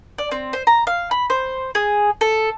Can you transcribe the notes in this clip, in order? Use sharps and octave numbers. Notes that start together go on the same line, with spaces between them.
D5
C4
C5
A#5
F5
B5
C5
G#4
A4